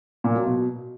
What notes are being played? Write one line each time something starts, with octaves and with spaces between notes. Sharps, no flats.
A#2
F#3
B2